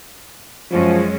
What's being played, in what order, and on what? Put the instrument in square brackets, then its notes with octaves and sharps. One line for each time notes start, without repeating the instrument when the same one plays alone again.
[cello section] F#2 G#3 C#4 [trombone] F3